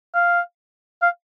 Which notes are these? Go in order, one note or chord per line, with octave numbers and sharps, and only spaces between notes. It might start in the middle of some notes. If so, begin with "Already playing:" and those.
F5
F5